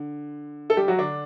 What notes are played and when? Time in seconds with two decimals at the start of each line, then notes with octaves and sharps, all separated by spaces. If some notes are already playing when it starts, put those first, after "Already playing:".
Already playing: D3
0.70 A4
0.77 G3 G4
0.88 F#3 F#4
0.99 D3 D4